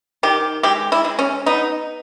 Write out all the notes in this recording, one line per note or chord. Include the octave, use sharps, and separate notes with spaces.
D#3 G4
G#3 G4
E4
G#3
C#4
B3 D#4